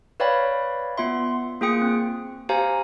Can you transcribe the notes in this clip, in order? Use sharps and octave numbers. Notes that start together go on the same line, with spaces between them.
B4 C#5 D5 F5 G5 B5
B3 F4 E5 C6
A#3 F4 G#4 G5 D#6 C#7
C4
G4 C5 F5 G#5 A#5